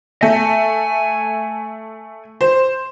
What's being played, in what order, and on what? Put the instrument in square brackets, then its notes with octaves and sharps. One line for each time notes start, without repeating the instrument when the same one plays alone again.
[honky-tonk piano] A3 [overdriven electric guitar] G#5
[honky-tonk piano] C5